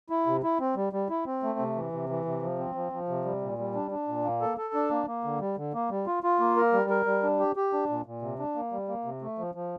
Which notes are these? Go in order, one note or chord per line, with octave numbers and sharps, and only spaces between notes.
E4
C3
E4
C4
G3
G3
E4
C4
A3
C3
E3
C3
E3
C3
F3
C4
F3
F3
C3
G3
A#2
G3
D4
D4
A#2
A#3
A4
A4
D4
A#3
A#3
D3
G3
D3
A#3
G3
F4
F4
A#3
A#4
G3
A#4
G3
D4
G4
G4
D4
A#2
A#2
C3
D4
A#3
G3
A#3
C3
A3
F3
F3